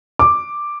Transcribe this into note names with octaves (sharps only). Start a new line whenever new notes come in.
D6